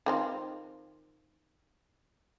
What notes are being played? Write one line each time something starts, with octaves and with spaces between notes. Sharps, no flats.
D#3 C4 F4